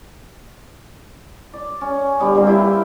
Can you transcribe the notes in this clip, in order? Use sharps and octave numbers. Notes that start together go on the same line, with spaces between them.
D5
C#4
D3 G3 B3
G3 A#3 C4 F4
E4 B4 E5 G5